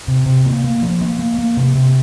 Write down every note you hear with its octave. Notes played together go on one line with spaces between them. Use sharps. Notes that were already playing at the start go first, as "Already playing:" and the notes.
C3
C3
A#3
A#3
F3
A#3
A#3
A#3
C3
C3